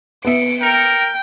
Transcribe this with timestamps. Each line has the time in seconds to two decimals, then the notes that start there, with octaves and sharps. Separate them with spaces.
0.25 B3 E5 C#7 D7
0.63 A#4 G5